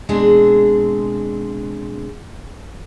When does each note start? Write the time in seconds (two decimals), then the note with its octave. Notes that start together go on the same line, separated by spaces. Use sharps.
0.09 B2 G#3 C4 D4 G#4